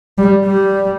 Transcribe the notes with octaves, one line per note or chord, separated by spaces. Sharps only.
G3
G3